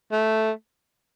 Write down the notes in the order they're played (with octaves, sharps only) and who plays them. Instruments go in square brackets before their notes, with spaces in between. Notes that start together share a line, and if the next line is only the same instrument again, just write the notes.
[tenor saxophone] A3